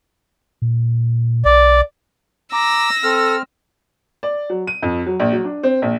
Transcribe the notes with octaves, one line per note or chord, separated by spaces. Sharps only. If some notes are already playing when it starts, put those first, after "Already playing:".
A#2
B1 D5
A#5 D6 E6 A#6
C4 A4 F6
D5
F#3
D#7
F2
F#3
A#1
F#3
D4
C4
A#1